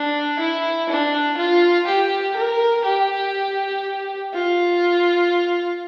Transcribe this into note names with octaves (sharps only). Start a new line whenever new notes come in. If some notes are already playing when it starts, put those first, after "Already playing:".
Already playing: D4
E4
D4
F4
G4
A#4
G4
F4